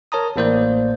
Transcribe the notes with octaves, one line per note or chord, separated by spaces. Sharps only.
A#4 C#5 A5 A#5 D#6
A1 A2 A#3 C5 D5 G6